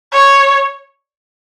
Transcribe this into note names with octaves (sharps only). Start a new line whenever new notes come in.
C#5